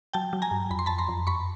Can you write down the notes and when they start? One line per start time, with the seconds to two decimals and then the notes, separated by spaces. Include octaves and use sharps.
0.13 F#3 G5 A5
0.33 F#3
0.42 G#5 A#5
0.51 G2
0.70 F2 B5
0.79 C6
0.86 F2 A5 B5
0.98 A#5 C6
1.09 F2
1.27 F#2 B5 C#6